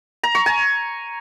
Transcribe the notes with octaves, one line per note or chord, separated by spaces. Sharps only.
A#5
C#6
G#5